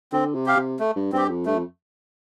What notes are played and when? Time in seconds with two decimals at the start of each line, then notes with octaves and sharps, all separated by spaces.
0.12 D3 C4
0.35 C3
0.46 G4 F5
0.57 C3
0.80 A3
0.96 G2
1.13 G2 C4 G4
1.30 F2
1.46 G2 A3
1.56 F2